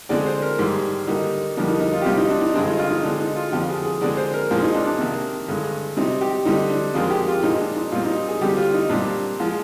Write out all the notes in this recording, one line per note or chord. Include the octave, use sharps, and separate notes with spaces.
D3 G#3 C4 D5
C5
A#4
G#2 D#3 G3 A#3
D3 G3 A#3 D#4
F2 D3 G3 A#3 D4
D#4
D#4
F4
G4
C3 G3 C4 F4
D#4
D4
D#4
G2 D3 G#3 C4 D4
D#4
F4
D#4
D3 G#3 C4 D4
D#4
F4
F2 D3 F3 C4 G4
G#4
G#4
D3 G#3 C4 D5
C5
A#4
A#2 F3 G#3 C4
D#4
D4
D4
C3 D#3 A#3
G2 D3 G#3
C3 G3 C4 D#4
G4
D3 G3 C4 D#4
D4
F2 D#3 G#3 C4 F4
G4
F4
A#2 G#3 C4 D#4
D4
D#4
A#2 G3 C4 F4
D#4
G#4
D3 G3 C4 G4
F4
D#4
A#2 G3 C4 D4
F3 G#3